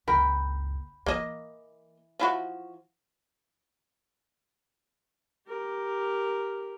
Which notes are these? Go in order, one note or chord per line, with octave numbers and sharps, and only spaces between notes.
F#1 C#2 A#4 G5 B5
E3 A#3 D#5
F3 E4 F#4
G4 A#4